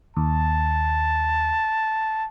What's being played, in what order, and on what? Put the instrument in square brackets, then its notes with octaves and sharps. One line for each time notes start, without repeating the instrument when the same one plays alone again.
[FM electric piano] D#2 [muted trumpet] A5